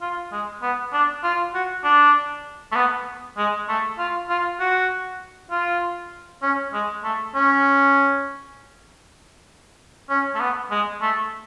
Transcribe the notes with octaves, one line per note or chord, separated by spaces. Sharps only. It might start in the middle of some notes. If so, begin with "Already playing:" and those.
F4
G#3
B3
D4
F4
F#4
D4
A3
B3
G#3
A3
F4
F4
F#4
F4
C#4
G#3
A3
C#4
C#4
A3
B3
G#3
A3